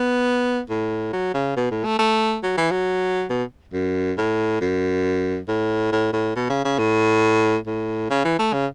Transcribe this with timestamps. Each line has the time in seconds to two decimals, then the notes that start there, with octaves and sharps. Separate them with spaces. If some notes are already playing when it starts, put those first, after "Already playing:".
Already playing: B3
0.69 A2
1.13 F#3
1.34 C#3
1.56 B2
1.71 A2
1.85 A3
1.99 A3
2.43 F#3
2.57 E3
2.71 F#3
3.30 B2
3.73 F#2
4.18 A2
4.61 F#2
5.48 A2
5.92 A2
6.13 A2
6.36 B2
6.50 C#3
6.65 C#3
6.78 A2
7.66 A2
8.10 C#3
8.25 E3
8.39 A3
8.53 C#3